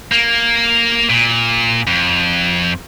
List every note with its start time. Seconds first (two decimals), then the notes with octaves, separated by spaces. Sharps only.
0.12 A#3
1.10 A#2
1.87 F2